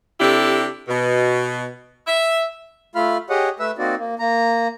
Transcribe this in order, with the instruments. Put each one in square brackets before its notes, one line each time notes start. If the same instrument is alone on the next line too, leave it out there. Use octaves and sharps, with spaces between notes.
[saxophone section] C3 D4 E4 G4 A4
B2
E5
[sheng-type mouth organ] A3 F4 F5 B5 F6
G4 G#4 C#5 D#5 F#5
A3 B4 E5 E6
A#3 C4 D#4 F#4 D5
A#3
A#3 A#5